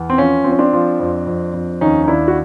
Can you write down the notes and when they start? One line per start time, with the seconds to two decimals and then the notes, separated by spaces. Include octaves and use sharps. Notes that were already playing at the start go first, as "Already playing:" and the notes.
Already playing: E2
0.10 C4
0.18 F3 C#4
0.44 F3 C4
0.52 C#4
0.59 C4 D4
0.73 F3
1.00 F2
1.27 F2
1.54 F2
1.81 D#2 C#4 D#4
2.04 D#4
2.07 D#2 D4 E4
2.28 F#4